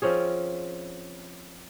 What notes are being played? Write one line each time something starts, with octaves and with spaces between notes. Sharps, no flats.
F3 C4 C#4 G#4